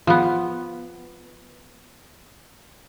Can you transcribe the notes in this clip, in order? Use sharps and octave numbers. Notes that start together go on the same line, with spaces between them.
F3 B3